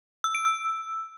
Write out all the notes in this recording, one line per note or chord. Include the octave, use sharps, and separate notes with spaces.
E6
D7
E6